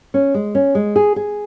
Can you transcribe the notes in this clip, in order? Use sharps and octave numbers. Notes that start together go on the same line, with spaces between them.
C#4
G#3
C#4
G#3
G#4
G#4